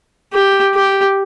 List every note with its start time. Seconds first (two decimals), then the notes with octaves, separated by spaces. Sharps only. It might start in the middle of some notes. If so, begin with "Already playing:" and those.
0.33 G4
0.74 G4